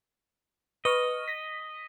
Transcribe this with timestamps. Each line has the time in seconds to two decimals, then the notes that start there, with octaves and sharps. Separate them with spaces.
0.85 B4 D#5 C#6 F6
1.28 A#6 B6